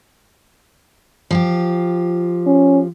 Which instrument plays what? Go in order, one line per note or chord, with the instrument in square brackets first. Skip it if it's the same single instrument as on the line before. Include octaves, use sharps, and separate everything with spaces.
[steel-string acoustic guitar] F3 F4 G4
[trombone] C#4